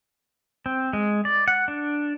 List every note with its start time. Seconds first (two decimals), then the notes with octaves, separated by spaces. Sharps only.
0.66 C4
0.93 G#3
1.25 D5
1.48 F#5
1.68 D4